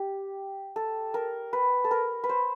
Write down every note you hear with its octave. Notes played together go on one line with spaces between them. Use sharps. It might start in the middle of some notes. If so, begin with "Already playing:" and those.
Already playing: G4
A4
A#4
B4
A4
A#4
B4
C5